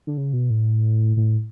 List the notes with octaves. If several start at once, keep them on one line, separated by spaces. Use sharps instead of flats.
D3
C#3
B2
A2
A2